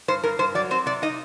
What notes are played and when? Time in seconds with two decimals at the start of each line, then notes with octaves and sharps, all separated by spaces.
0.08 G2 C5
0.24 G2 A#4
0.39 G2 C5
0.55 F#3 D5
0.71 C4 C5
0.86 C3 D5
1.02 D#4 D#5